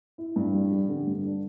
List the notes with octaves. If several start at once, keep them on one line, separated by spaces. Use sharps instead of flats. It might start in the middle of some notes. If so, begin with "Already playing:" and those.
E4
G2
G3
G3
D3
G2
D4